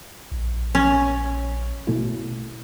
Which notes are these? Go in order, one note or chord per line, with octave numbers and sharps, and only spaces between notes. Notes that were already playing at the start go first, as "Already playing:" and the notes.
A#1
C#4
B2 A3 E4